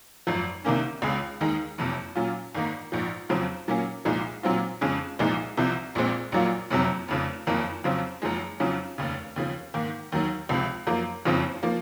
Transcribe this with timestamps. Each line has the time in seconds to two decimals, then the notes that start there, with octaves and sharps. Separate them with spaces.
0.27 G#1 F#2 F3
0.65 C2 C3 D#3 A#3 C#4
1.02 C#2 C#3 G#3
1.41 D#2 D#3 G#3 D#4
1.78 F#1 F2 C3
2.15 A#2 F#3 C#4 F4
2.55 G#1 G#2 D#3 A#3 D#4
2.92 A#1 G#2 F3
3.29 F2 C#3 F#3 C4 F4
3.68 A#2 F#3 A#3 C#4
4.05 C2 A#2 F3 G#3 D#4
4.43 A#2 F#3 C4 F4
4.81 F2 C#3 G#3 C#4
5.19 C2 A#2 F3 G#3 D#4
5.57 C2 C3 F3
5.95 A#1 A#2 G#3 C4
6.32 A#1 A#2 F#3 A#3 F4
6.70 F#1 F2 C3 F#3
7.08 F1 F2 C#3
7.47 F#1 F2 D#3 A#3 D#4
7.84 F2 C#3 F#3 C4 F4
8.22 F#1 F#2 F3 G#3
8.60 F2 C#3 F#3 C#4 F4
8.98 F1 D#2 C#3
9.36 D#2 C#3 F3
9.74 G#2 D#3 A#3
10.12 D#2 D#3 F#3
10.49 C#2 C3 F3
10.87 F#2 F3 A#3
11.25 F#1 F2 C#3 F3 C4
11.63 F3 A#3